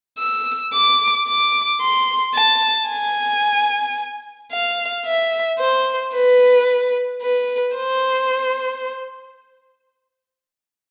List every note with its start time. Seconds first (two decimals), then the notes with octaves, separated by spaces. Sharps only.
0.19 E6
0.74 D6
1.28 D6
1.81 C6
2.35 A5
2.89 G#5
4.52 F5
5.06 E5
5.60 C5
6.14 B4
7.22 B4
7.76 C5